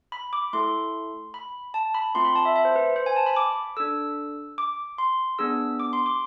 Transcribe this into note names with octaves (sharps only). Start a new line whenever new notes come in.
B5
D6
A3 E4 A4 C6
B5
A5
B5
A3 C4 F4 C6
B5
A5
E5
E5
C5
B4
C5
G#5
A5
B5
D6
D4 A4 E6
D6
C6
B3 D4 G#4 E6
D6
C6
D6